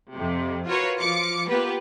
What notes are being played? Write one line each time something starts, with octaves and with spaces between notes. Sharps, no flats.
F2 C3
F4 F#4 A#4 B4 C#5
F3 F4 D6 C#7
A#3 B3 F4 G4 B4